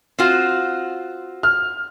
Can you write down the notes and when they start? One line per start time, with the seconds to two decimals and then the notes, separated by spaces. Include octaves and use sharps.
0.19 C4 F4 F#4
1.43 F6